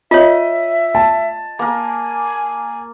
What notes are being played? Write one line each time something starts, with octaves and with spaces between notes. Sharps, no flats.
F4 C#5 D#5 E5
A5
A#3 A#4 G#5